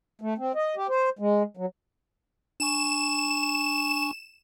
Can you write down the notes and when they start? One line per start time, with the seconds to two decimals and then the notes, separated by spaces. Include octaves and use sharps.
0.22 A3
0.38 C4
0.55 D#5
0.76 G4
0.89 C5
1.19 G#3
1.57 F#3
2.60 D4 G#5 C#6 E7